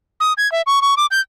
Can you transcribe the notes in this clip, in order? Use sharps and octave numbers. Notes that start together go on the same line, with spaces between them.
D#6
G#6
E5
C#6
C#6
D6
G6